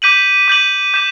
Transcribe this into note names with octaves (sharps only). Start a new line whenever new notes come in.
D6 G6 B6 D#7 F#7
D6 G6 B6 D#7 F#7
D6 G6 B6 E7